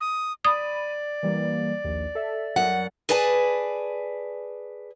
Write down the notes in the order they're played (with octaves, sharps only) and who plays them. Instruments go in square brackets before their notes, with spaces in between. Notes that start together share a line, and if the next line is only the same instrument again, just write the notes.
[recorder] D#6
[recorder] D5 [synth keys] B5 D#7 [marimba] D#6
[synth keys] E3 G3 A#3
A#1 D#2
A4 E5
[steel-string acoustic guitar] F#2 F#5
G#4 B4 D5 G#5 A5